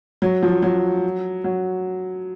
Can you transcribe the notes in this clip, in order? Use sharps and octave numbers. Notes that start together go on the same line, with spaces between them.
F#3
F3
F#3
F#3